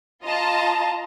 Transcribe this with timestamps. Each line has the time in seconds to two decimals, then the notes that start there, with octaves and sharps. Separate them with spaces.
0.23 F4 D#5 A5 A#5